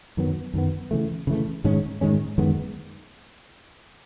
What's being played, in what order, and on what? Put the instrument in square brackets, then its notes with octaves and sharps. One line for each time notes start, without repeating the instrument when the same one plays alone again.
[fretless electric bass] F#2 D#3 F#3 B3
F#2 D#3 F#3 B3
C#3 E3 A3
C#3 E3 A3
G#2 D#3 G#3 C#4
G#2 D#3 G#3 C#4
F#2 D#3 G#3 B3